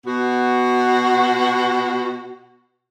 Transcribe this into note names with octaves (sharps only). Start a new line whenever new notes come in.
B2 B3 F#4